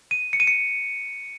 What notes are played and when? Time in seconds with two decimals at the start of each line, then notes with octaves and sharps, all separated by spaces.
0.11 D#7
0.33 C#7
0.40 D#7
0.47 C#7